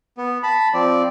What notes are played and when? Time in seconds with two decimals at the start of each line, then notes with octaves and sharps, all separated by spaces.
0.18 B3
0.43 A5 B5
0.74 F3 C4 D5